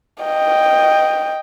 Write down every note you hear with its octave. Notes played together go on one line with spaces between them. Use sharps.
D#5 G5